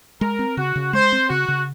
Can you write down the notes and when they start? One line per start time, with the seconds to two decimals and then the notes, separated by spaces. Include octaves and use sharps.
0.21 G#3 A#4
0.39 C4
0.57 C#3 F#4
0.76 C#3
0.93 G#3 C5
1.12 C4
1.30 C#3 F#4
1.48 C#3